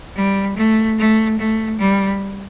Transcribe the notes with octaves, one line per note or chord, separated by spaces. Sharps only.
G3
A3
A3
A3
G3